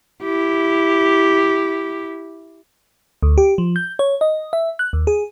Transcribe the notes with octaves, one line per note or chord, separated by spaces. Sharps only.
E4 G4
D2
G4
F3
G6
C#5
D#5
E5
F#6
D#2
G#4